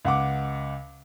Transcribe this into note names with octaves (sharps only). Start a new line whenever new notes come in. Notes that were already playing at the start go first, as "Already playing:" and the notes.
C#2 F#5 D6